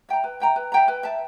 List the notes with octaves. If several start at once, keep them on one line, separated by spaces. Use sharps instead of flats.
E5 G5 A#5
B4
E5 G5 A#5
B4
E5 G5 A#5
B4
E5 A5